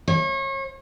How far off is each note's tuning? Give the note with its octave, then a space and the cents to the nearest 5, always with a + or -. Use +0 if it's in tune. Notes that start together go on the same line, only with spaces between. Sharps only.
C#5 -35